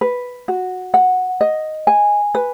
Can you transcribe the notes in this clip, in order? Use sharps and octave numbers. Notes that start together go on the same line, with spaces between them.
B4
F#4
F#5
D#5
G#5
B4